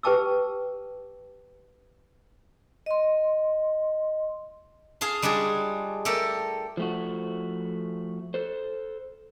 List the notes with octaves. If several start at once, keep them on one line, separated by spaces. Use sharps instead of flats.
G4 B4 G5 A5 D6 E6
D#5 C6
G#4 F5 A5 C6
G3 G#3 D4 F4 G#4
A3 G4 A4 A#4
F3 A3 F#4
A4 C5